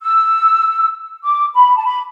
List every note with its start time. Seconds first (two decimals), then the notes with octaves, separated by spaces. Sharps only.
0.02 E6
1.24 D6
1.54 B5
1.76 A5
1.84 B5